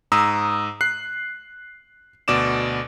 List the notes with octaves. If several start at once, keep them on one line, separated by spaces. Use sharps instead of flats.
G#2 A#5 D#6 E6
F#6 C7
D2 B2 D5 D6 E7